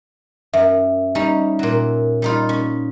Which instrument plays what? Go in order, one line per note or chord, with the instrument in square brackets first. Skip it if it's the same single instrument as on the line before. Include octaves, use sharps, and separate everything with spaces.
[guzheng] F#2 [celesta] E5
[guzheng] G3 C#4 D#4
A#2 F#3
G3 D#4 F4
C#4